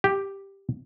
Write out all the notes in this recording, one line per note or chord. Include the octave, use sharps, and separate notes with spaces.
G4